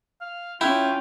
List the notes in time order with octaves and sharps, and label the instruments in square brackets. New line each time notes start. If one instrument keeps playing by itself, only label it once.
[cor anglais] F5
[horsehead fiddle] C#4 [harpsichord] E4 [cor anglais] F4 [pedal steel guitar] G5